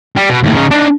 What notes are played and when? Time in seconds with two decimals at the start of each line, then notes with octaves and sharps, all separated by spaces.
0.17 G3
0.30 B2
0.43 D#2 A2
0.55 C#3 D#4
0.71 D4 D#4